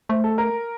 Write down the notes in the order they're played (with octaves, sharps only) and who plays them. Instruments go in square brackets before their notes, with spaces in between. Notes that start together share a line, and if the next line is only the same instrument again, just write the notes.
[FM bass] A3 [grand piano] C5
[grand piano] A4
A#4